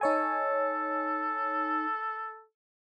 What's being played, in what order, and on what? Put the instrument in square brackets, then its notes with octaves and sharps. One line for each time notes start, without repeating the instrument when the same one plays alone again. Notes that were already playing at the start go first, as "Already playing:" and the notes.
[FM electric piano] D#4 C#5 G#5 [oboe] A4